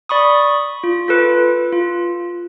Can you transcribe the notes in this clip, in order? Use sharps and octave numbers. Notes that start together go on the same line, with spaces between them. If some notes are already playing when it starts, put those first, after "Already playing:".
D5 B5 C#6 D#6
F4
F4 A4 B4
F4